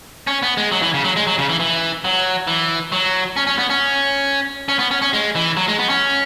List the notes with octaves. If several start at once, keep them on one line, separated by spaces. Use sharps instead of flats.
C#4
B3
G#3
F#3
E3
C#3
F#3
G#3
F#3
C#3
E3
E3
F#3
E3
F#3
C#4
C#4
B3
C#4
C#4
B3
C#4
C#4
G#3
E3
F#3
G#3
B3
C#4